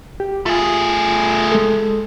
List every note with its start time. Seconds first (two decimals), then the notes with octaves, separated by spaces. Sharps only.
0.20 G4
0.46 A3 F4 G#4
1.52 G#3 A4